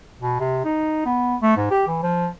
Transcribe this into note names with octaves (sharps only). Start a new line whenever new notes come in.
B2
C3
D#4
B3
A3
G#2
G4
E3
F3